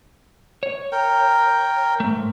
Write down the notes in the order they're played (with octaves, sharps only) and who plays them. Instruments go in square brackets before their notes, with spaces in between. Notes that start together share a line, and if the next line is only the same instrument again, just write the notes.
[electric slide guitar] C#5
[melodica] A#4 G5
[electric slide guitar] G#2 A3